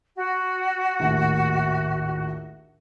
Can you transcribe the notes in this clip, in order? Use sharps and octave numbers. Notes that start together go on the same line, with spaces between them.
F#4
A#1 D#2 A2